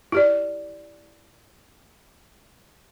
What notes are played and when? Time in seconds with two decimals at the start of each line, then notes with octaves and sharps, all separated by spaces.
0.12 E4 G4 D5